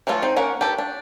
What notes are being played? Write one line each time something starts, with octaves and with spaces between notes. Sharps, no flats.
E3 F#3 A3 F4 C#5
C4 D#4
A#3 C#4 A#4 F#5
G4 A4 B4
D4